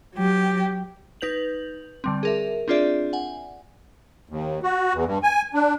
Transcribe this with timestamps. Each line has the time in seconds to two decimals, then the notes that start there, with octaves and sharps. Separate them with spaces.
0.15 F#3 G4
1.21 D#4 B4 G6 F7 F#7
2.04 D3 G3 C4
2.23 G#4 A#4 E5
2.68 C4 D4 F4 G#4 D5 E5
3.13 F#5 G#5
4.30 D#2
4.63 F#4
4.94 E2
5.05 G2
5.23 G#5
5.54 D4